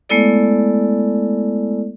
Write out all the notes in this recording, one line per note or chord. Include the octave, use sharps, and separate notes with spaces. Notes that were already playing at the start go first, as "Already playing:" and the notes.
G#3 A3 B3 E4 A4 D5